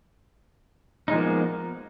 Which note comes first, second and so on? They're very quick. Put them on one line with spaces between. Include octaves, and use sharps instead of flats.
D#4 G#3 F3 A#3 B3